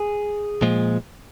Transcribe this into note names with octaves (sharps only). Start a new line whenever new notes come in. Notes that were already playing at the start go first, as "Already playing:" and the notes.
Already playing: G#4
A#2 F3 G#3